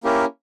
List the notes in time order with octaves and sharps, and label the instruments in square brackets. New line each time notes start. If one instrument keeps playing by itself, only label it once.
[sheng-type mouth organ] A#3 C#4 E4 G4 A#4